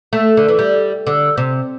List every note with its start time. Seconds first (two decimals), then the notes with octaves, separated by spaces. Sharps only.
0.13 A3
0.37 D3
0.48 E3
0.59 G3
1.07 D3
1.37 C3